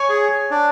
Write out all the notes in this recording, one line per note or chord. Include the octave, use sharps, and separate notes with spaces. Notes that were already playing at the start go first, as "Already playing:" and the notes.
Already playing: C#5 G#5 C#6
G#4
D4